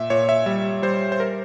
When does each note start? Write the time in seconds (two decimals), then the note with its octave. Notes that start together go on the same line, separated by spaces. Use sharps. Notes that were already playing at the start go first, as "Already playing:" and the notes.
Already playing: A#2 E5
0.10 A#2 C#5
0.29 E5
0.46 G3 E5
0.82 G3 C5
1.12 C5
1.20 A#4